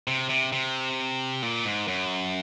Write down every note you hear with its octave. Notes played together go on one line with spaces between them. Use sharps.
C3
C3
C3
A#2
G#2
F#2